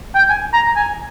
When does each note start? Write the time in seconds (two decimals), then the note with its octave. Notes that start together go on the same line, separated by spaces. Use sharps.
0.14 G5
0.29 G#5
0.53 A#5
0.76 G#5